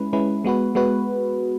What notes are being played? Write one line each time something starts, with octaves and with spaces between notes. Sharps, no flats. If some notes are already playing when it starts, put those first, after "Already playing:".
Already playing: G#3 C#4 E4 B4
G#3 C#4 E4 B4
G#3 B3 F#4 B4
G#3 B3 F#4 B4